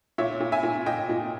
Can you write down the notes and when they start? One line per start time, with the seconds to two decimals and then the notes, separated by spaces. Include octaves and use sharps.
0.18 A#2 C#5 E5
0.40 A#2
0.52 E5 G#5
0.63 A#2
0.86 A#2 D#5 G5
1.09 A#2